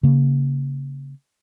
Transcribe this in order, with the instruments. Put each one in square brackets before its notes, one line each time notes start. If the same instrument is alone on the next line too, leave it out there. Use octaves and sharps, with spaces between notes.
[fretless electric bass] C#3 A#3